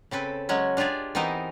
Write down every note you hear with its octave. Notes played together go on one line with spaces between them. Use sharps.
C#3 C4 A4 B4
F#3 G#3 C#4
D4 F4 G4 G#4 D5
E3 B3 C4 D#4 A#4 C5